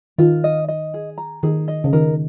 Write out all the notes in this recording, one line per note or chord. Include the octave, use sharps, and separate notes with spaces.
D#3 F4
D#5
D#5
G#4
A#5
D#3 G#4
D#5
C#3
D#3 A#4